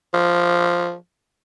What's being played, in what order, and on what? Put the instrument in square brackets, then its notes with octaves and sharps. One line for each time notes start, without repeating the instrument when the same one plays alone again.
[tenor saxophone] F3